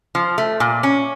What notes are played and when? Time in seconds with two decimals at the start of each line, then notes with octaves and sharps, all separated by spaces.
0.15 F3
0.38 A3
0.60 A#2
0.83 C#4